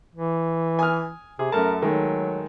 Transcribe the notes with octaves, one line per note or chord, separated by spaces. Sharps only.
E3
G#5 D#6 F6
C3 G#4
F#2 A3 A#4 A5
D#3 F#3 G#3 A3